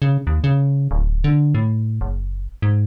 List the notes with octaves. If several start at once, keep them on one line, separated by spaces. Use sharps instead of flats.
C#3
D#2
C#3
D1
D3
A2
F#1
G#2